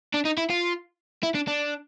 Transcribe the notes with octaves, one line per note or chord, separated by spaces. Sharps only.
D4
D#4
E4
F4
E4
D4
D4